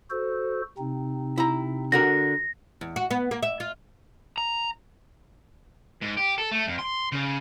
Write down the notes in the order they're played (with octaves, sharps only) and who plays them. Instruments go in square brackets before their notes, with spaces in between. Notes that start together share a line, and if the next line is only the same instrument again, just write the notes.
[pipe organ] F#4 A4 C5
C3 C4 D#4
[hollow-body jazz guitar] E4 A#5
[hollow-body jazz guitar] D3 F#4 A#4 [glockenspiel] A#6
[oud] E2
F#4
B3
A#3
E5
F4
[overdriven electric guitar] A#5
[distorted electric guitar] G#2
G4
A4
A3
F2
C6
C#3